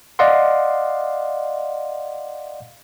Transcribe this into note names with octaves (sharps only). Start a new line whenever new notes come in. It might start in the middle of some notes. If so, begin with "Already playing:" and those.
D5 D#5 F5 F#5 C6